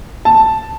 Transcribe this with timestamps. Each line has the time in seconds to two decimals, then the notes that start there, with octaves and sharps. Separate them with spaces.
0.25 A5